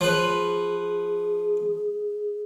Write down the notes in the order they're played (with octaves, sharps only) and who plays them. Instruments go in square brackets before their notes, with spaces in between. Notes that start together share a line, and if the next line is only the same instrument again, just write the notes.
[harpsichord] F3 B4 [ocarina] G#4